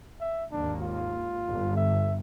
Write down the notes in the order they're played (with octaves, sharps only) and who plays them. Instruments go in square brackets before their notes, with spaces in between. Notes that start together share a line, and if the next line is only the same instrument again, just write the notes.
[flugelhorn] E5
[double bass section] G#1 D#2 A#3 [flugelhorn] D4
[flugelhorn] F4
[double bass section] G1
[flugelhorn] E5